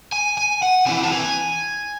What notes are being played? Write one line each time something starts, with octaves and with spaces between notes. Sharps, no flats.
G#5
G#5
F#5
C3 E3 C4 E4 G#5
A5
G#5